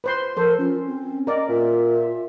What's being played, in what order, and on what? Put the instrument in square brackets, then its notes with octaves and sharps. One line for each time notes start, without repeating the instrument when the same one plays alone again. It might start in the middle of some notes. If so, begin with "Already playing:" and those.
[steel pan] B4 C5 C6
[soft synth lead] F3 [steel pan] A4 C5 [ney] A#4
[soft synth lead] C#4 [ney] F4
[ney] C4
[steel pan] A#4 D5 [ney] D#5
[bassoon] A#2 [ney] F4 [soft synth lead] E5